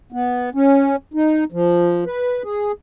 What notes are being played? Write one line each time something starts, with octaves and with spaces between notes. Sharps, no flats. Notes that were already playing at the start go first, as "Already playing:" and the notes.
B3
C#4
D#4
F3
B4
G#4